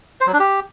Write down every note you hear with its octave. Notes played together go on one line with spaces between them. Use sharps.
C5
F#3
D4
G4